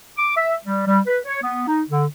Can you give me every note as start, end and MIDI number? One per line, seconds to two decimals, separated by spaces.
0.18 0.33 86
0.36 0.54 76
0.65 0.86 55
0.87 0.99 55
1.07 1.18 71
1.25 1.39 73
1.42 1.64 59
1.67 1.81 63
1.90 2.04 50